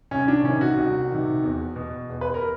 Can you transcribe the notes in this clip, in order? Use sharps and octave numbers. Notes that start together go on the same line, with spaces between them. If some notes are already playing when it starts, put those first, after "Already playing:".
C2 C#4
D4
C3 D#3 C#4
F#4
C2
C3 D#3
E2
B2
E2
B4
A#4